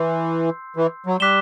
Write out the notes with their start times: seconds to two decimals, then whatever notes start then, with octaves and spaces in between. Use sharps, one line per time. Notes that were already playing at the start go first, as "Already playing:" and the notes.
Already playing: E3 C6 E6 G6 C7
0.76 E3
1.06 F#3
1.20 G3 D6 F#6 B6 E7 G7